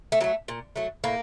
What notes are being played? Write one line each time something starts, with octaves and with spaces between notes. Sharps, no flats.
A3
F#3 A3 A#3
A#2
F#3 A3
A2 A#3